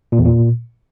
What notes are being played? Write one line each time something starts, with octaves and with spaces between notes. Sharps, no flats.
A#2
E2
A#2